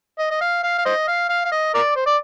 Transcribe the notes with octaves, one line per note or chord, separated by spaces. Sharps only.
D#5
D#5
F5
F5
F5
C5 D#5
F5
F5
F5
D#5
A#4 D5
C5
D5